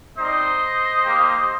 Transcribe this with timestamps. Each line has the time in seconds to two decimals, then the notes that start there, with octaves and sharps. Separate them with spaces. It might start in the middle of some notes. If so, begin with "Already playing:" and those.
0.16 G3 C4 D#4 C5 D#5
1.04 A#3 D#4 G4